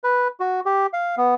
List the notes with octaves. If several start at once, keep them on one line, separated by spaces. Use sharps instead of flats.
B4
F#4
G4
F5
B3